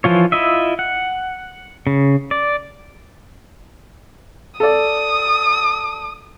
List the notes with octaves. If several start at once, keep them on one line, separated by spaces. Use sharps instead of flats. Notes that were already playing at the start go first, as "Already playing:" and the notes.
E3 F3 F4 C#5
E4 F4 D#5 E5
F#5
C#3
D5
A4 D5 D#6